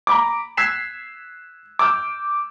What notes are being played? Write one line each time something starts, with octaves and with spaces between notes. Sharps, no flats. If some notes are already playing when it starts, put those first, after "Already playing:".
A#5 B5 D6
E6 F#6 G#6 B6 C7 E7
D6 E6 F6 G6